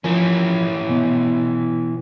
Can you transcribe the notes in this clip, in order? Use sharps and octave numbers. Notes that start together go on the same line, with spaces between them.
E3 F3 C#4 A#4
B2